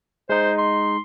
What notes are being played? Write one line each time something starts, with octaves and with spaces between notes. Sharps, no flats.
G#3 D#4 C5
C6